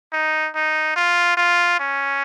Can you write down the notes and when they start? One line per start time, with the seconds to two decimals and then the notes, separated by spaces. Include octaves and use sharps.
0.13 D#4
0.55 D#4
0.96 F4
1.38 F4
1.79 C#4